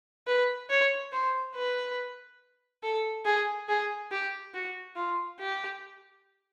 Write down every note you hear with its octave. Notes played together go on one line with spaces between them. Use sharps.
B4
C#5
C5
B4
A4
G#4
G#4
G4
F#4
F4
G4